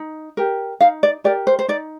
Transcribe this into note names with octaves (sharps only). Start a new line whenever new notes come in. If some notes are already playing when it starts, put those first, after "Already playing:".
Already playing: D#4
G4 A#4
D#4 F5
D5
G4 A#4 D5
C5
C5
D#4 D5